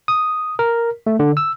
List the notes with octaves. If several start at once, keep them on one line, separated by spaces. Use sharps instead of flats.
D#6
A#4
A3
D3
E6